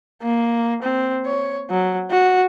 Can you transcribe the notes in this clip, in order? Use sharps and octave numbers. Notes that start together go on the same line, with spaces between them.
A#3
C4
C#5
F#3
F#4